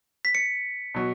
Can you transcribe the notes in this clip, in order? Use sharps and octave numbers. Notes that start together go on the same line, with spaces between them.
B6
C#7
B2 F#3